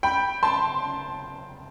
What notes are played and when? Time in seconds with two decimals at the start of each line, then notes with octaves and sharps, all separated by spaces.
0.03 G5 B5
0.43 A5 C6